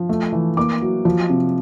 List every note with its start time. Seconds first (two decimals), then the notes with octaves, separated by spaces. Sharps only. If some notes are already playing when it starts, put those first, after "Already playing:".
Already playing: F3
0.09 A3
0.32 E3
0.57 A#3 D6
0.82 F#3
1.05 F3
1.29 C3